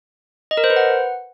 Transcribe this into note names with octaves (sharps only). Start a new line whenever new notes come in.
D#5
A#4
C5
B4
F#5